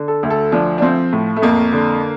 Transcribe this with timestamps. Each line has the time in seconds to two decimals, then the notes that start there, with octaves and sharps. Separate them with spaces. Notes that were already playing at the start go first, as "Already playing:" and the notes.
Already playing: D3
0.08 A4
0.23 D2
0.30 A4
0.52 F3 D4
0.78 D4
0.82 F3 C4
1.13 A2
1.36 A3
1.42 F2 A#3
1.72 D3